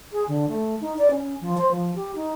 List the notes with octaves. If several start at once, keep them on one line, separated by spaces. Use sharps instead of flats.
G#4
D3
A3
D#4
D5
C#4
F3
C5
F3
G4
D#4